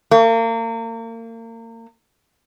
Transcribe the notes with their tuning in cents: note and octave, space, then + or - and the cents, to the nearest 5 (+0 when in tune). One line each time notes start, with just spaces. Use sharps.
A#3 -35